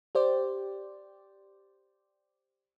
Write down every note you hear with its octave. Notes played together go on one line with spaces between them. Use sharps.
G4 C5 D5